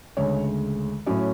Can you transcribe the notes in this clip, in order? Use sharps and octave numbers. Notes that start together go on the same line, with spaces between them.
D2 C#3 G#3 C#5
A2 F#3 C#4 C#5